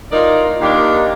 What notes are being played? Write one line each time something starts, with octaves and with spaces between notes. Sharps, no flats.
A2 D#4 F4 A#4 D5
D#2 D#3 D4 G4 F5